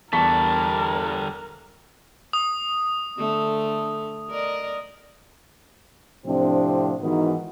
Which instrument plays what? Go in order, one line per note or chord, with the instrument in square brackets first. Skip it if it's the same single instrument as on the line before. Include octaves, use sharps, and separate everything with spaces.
[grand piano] E2 C#6 B6 [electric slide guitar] D3 G3 A4 [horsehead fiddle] A#4 [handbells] A5
[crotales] D#6
[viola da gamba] D3 A3
A#4 D5 D#5
[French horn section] A2 C3 F3 C4 D4
G#2 D#3 E3 B3 D#4 F#4